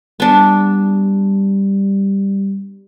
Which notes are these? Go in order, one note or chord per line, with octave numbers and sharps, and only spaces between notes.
G3 B3 D4